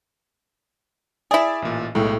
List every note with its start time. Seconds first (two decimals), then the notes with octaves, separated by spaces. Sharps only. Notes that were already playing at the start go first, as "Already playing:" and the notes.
1.31 E4 G#4 D5 E5
1.62 A1 A#2
1.95 B1 A2 G#3 G5